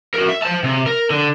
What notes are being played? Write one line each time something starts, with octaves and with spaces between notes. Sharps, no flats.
F#4 A#4
E5
C5 A5
C3
A#4
D3